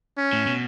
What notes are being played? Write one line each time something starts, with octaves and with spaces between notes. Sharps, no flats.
C#4
A2
B2